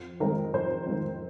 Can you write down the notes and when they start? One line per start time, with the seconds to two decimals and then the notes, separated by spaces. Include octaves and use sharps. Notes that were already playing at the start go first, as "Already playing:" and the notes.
Already playing: F2
0.20 D#3 G#3 C4 A#4
0.54 F2 C5
0.87 D#3 G#3 C4